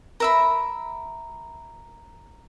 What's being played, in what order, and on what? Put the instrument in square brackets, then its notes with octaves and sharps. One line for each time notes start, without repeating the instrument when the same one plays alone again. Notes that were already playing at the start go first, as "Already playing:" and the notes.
[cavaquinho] A#4 E5 B5